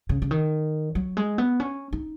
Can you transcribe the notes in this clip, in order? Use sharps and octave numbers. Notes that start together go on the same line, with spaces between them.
C#3
C#3
D#3
F#3
G#3
B3
C#4
D#4